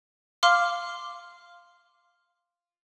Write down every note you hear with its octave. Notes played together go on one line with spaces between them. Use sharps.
F5 C6 D6 F6